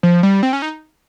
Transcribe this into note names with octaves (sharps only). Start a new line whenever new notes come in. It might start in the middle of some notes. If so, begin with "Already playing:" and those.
F3
G3
C4
C#4
D#4